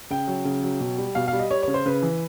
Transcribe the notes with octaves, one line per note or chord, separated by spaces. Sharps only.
C#3 G5
F#3
C#3
F#3
B2
G3
B2 F5
F5
G3
D#5
G3 C#5
C#3 C#5
C5
C#3 B4
E3